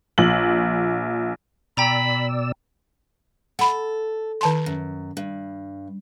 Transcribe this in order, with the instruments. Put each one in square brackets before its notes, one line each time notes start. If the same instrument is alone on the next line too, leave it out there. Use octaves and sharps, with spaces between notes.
[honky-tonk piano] A#1 F#7
[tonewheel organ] B2 D5 E6 [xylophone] G5 A#5 F7 [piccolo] B5
[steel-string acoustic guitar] A4 [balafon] F#5 B5
[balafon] D#3 A5 C6
[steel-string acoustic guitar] F#2
G2